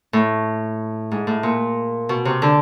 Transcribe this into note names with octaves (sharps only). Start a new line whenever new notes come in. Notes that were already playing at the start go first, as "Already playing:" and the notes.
A2
G#2
A2
A#2
B2
C3
D3